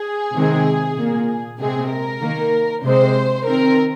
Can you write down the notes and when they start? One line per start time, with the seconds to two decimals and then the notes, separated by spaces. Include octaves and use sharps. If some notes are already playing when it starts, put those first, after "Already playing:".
Already playing: G#4
0.33 C3 D#3 G#3 C4
0.96 A#2 A#3
1.59 C3 G#3 C4 G#4
1.90 A#4
2.21 D#3 A#3
2.83 C3 G#3 C4 C5
3.46 D#3 C4 A#4